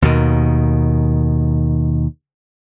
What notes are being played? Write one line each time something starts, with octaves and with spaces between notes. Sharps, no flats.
D#2 B2 D#3